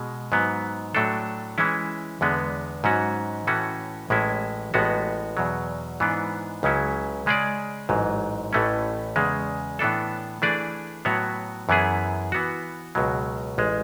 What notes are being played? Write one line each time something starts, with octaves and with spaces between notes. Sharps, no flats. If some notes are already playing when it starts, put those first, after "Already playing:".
Already playing: B2 G#3
G#2 F#3 B3
A2 F#3 A3 D4 A4
E3 G#3 C#4 E4
E2 D3 G#3 B3
G#2 F#3 C#4 F#4
A2 E3 A3 C#4 F#4
A1 A2 G#3 C#4 E4
A1 A2 G#3 B3 F#4
E2 B2 F#3
G#2 E3 B3 D4
C#2 C#3 F#3 C#4 E4
C#3 G#3 C#4 G#4 D5
A1 G#2 F#3
A1 A2 E3 A3 C#4
E2 C#3 G#3
A2 E3 B3 D4 A4
E3 A3 D4 G#4 D5
A2 F#3 B3 F#4 C#5
F#2 E3 B3 E4 G#4
E3 B3 F#4
C#2 B2 F#3
A1 G#3